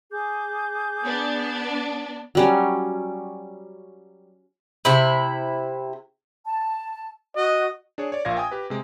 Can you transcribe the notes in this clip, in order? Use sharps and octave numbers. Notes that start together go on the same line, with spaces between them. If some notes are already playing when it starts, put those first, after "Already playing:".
G#4 D6 G6
B3 D4
F#3 G3 C#4
C3 E4
A5
F#4 D#5
D4 G#4 C#5
C#5 D5
A#1 A#2 F5 G#6 A#6
G5 G#5 D#6
G4 B4
C3 G#3